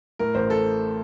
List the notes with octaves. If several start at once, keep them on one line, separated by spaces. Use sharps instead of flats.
A2 A#4
A1 C5
A4